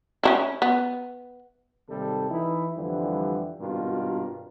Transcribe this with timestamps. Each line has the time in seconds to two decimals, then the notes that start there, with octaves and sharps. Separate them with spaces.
0.23 C#4 D4 E4
0.62 B3
1.89 G#1 D#2 C3 G3 A4
2.31 E3 D#4 E4
2.77 F2 D3 E3 F3 G3
3.60 G#1 G2 B2 F4 F#4 A#4